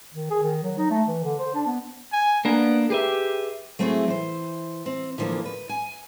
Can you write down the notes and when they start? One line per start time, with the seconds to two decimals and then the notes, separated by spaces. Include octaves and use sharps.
0.14 D#3
0.30 G#4
0.43 D#3
0.63 F#3
0.78 D#4
0.91 A3
1.07 E3
1.24 D3
1.39 C5
1.54 D4
1.67 B3
2.13 G#5
2.45 A#3 B3 D4 A#4
2.90 G4 G#4 B4 E5
3.79 F#3 A3 C4 E4 F4 G#4
4.08 E3 C5
4.86 C4
5.18 D3 E3 F3 A3 A#3
5.45 B4
5.69 G#5